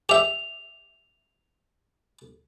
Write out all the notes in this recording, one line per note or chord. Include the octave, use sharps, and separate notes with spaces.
G4 E5 F7